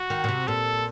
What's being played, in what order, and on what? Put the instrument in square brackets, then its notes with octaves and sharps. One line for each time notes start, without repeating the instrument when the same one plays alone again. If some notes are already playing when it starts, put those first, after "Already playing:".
Already playing: [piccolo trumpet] F#4
[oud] D#3
A#2
C3
[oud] A#2 [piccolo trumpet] A4